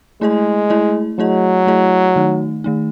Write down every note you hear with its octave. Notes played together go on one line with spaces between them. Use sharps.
G#3 A3 E4 G#4 D#5
A3 E4 G#4 D#5
F#3 A3 E4 G#4 D#5
A3 E4 G#4 D#5
D#3 A3 D#4
D#3 A3 D#4